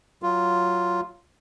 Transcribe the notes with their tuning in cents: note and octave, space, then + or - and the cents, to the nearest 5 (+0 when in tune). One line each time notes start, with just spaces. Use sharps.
F#3 +0 F4 +0